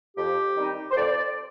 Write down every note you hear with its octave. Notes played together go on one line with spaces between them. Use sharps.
F2 G4
D#3 G3 C4 D#4
C5
F2 D5